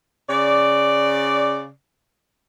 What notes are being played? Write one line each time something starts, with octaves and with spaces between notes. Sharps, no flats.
C#3 D5